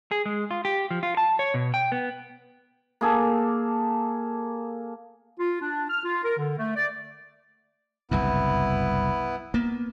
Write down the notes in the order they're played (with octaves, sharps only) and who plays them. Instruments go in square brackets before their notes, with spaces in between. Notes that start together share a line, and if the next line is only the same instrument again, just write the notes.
[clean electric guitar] G#4
G#3
F4
G4
F3
F4
A5
C#5
B2
G5
B3
[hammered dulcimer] A#3 G#4 A4
[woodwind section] F4
D4
F6
F4
A#4
D3
A3
D5
[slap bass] F#1 C2 G2 [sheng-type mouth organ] B3 E4
[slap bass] A#3 B3